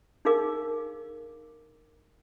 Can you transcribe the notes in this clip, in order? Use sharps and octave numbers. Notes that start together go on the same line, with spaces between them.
D4 D#4 G#4 A#4 F5 D6